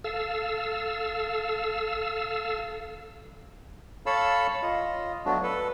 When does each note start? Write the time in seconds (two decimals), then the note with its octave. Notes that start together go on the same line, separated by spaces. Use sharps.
0.04 A4 F5 E6
4.06 A4 C#5 F5 A5 B5 E6
4.62 F4 D#5
5.25 F#3 A3 B3 D4 F#4
5.43 A4 B4